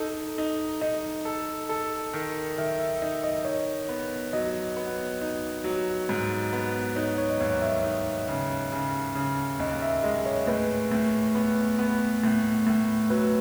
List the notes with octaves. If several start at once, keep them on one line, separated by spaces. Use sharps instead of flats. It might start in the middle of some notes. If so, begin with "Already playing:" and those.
Already playing: D#4 A4
D#4
D#4 D#5
A4
A4
D#3
D#3 E5
E5
D#4 D#5
D#5
D#4 C#5
B3
F#3 D#5
B3
D#4
F#3
G#2
B3
D#4 C#5
C#5
D#5
D#2 C#5
E5
D#4
C#3
C#3
C#3
D#2 D#5
E5
G#3 D#5
C#5
A2 B4
A2
B3
B3
A2
A2
F#3 B4